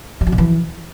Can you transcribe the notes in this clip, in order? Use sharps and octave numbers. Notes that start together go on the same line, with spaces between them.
G3
F#3
A#2
E3